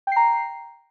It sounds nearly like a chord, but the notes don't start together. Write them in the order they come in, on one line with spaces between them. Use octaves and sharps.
G5 C7 A#5